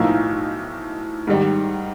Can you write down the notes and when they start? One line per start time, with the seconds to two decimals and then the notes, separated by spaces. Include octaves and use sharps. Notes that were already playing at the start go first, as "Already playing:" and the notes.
Already playing: B1 A2 F3 A#3 D#4
1.27 G#2 D#3 G3